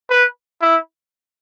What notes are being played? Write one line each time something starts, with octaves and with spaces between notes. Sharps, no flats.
B4
E4